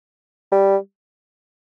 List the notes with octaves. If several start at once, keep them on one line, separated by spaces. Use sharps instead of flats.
G3